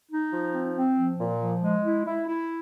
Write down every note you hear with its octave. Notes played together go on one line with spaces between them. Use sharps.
D#4
F3
C4
C4
F3
A#2
F3
G#3
E4
E4
E4